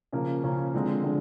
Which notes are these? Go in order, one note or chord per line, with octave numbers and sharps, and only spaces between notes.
C#3 F3 A#3 C#4
C#3 F3 A#3 C#4
D3 F3 G#3 C4
D3 F3 G#3 C4